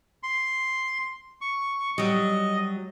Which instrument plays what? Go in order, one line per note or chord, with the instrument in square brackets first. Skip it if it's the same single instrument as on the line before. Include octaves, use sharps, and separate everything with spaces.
[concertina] C6
C#6
[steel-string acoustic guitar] F#3 G3 [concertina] D#5